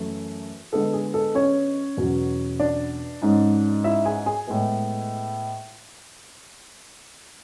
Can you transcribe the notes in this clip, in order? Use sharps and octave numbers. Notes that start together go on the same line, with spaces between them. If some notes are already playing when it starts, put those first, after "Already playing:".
Already playing: F#2 E3 A3
D3 G#3 B3 A4
G#4
A4
C#4 C#5
E2 B2 F#3 C#4
D4 D5
G#2 G#3 C#4
E4 E5
G#4 G#5
G#4 G#5
A2 G#3 B3